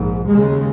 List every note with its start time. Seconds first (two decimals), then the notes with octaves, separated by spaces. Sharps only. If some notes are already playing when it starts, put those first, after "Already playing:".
Already playing: A#1 G#2
0.28 D#2 C#3 G#3